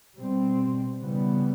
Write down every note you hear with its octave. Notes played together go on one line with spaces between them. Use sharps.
B2 G3 C4
C#3 E3 G3 B3